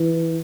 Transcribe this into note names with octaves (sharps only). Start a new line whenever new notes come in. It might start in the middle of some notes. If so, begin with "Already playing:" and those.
Already playing: E3